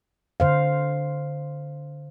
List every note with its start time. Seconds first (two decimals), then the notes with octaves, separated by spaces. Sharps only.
0.40 D3 C5 F5